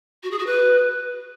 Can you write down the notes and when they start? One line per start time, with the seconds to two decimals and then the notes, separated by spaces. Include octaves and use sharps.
0.23 F#4
0.31 G#4
0.39 F#4
0.46 B4